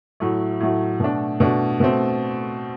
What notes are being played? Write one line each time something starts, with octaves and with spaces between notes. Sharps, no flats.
A2 F#3 A3
A2 F#3 A3
B2 A3 D4
B2 A3 D4
B2 A3 C4